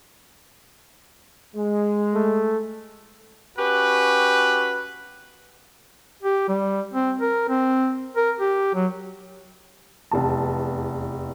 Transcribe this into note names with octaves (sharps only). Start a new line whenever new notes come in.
G#3
A3
C#4 F#4 G4 B4
G4
G3
C4
A#4
C4
A#4
G4
F#3
F1 E2 A5